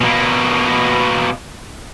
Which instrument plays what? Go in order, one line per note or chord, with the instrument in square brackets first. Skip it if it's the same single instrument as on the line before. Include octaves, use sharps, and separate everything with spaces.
[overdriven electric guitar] B2 A#3